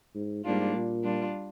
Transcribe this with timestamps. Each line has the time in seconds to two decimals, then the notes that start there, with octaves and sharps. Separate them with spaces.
0.15 G#2
0.44 G#2 G3 A#3 D4 F4
0.75 A#2
1.04 G3 D4 F4